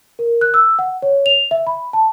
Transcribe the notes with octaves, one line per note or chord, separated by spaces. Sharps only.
A#4
F#6
E6
F#5
C#5
F7
E5
B5
A5